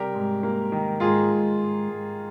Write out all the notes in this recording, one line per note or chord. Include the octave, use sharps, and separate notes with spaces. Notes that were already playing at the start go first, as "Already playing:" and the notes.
Already playing: C3 G3 G4 A#4
G#2
A#3
D#3
G#2 F4 G#4
G#2
G#2
G#2